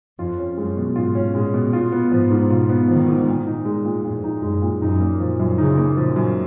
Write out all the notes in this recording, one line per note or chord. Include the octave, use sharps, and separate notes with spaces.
F2 F4
C#4
F#2 G#3
B2
G#2 F4
C#4
A#2 G#3
B2
F4
B3
G#2 F3
G#2
B2 F4
B3
D#3 F3
G#2
A#2
D#4
G#3
A#2
F2 A#2
D#4
F#2 G#3
A#2
F#2 D#4
A#3
A#2 F3
F#2
C#3 D#4
A#3
A#2 F3
F#2